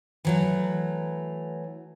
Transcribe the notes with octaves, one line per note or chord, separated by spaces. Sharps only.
E3 F#3 A3